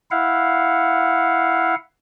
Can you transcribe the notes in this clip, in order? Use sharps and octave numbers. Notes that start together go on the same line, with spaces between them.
E4 F5 F#5